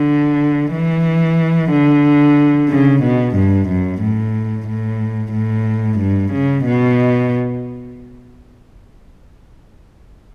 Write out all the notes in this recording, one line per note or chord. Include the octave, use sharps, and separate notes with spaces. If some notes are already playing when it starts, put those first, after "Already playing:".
Already playing: D3
E3
D3
C#3
B2
G2
F#2
A2
A2
A2
G2
C#3
B2